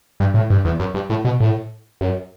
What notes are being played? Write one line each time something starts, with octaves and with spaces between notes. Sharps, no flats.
G2
A2
G2
E2
F#2
G2
A2
B2
A2
F#2